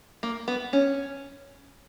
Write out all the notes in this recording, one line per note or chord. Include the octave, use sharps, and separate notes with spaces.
A#3
B3
C#4